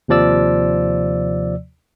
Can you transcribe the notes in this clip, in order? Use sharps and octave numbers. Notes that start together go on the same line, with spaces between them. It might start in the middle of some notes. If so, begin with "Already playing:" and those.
D#2 C3 F3 D5 E6